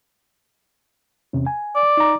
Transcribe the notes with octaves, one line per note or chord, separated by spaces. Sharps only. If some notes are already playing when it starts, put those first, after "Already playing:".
E2 C3 C#4
G#5
D5
D#4 A#5